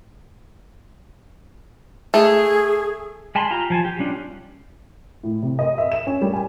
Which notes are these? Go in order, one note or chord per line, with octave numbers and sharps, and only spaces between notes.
A3 G#4
G#3 G#5 A5 B5 C6
F4 G4 A#5
F3 G#5 A5
G4
G3 C#4 D4 F4
A2
C3
D#5
E5
E7
C#4
G3
G#5